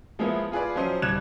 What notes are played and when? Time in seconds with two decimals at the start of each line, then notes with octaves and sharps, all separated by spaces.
0.19 F3 G#3 A#3 B3 E4
0.52 F4 G#4 B4 D5
0.76 F3 F#3 C#4 C5 D#5
1.02 D#1 G3 D5 F#6 G#6 E7